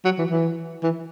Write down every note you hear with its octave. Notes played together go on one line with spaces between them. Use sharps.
F#3
E3
E3
E3